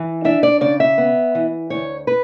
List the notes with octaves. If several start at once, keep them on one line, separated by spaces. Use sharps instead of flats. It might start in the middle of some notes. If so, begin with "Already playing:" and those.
Already playing: E3
D4 E5
D5
C#3 D5
E5
B3
E3
D2 C#5
B4